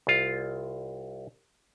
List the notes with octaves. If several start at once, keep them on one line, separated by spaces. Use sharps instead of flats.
C2 F4